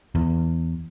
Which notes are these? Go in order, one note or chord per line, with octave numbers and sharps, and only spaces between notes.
E2